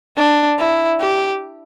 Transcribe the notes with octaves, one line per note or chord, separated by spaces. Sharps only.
D4
E4
G4